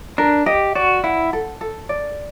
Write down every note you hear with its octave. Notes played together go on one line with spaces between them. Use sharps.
D4 A#4
G4 D#5
F#4 D5
E4 F#5
A4
A4
D5